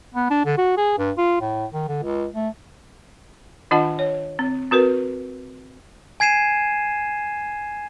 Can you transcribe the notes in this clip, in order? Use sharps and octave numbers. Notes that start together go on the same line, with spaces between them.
B3
D4
D3
F#4
G#4
G2
F4
A2
D#3
D3
C#2
A3
D#3 D4 F4 D#5 F#5 A5
C#5
C4
C4 F#4 A#4 B4
G#5 G#6 C7 D#7 E7